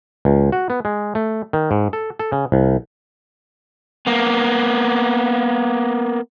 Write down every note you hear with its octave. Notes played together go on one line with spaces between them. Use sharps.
C#2
F#4
B3
G#3
A3
D#3
G#2
A4
A4
C#3
C2
A#3 B3